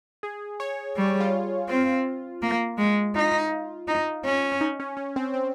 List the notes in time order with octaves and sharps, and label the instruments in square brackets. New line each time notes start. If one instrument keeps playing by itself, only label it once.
[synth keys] G#4
C#5
[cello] G3
[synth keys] F4
[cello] C4 [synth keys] F4
[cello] A#3
G#3
[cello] D#4 [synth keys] F4
[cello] D#4
C#4
[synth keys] D#4
C#4
C#4
C4
C4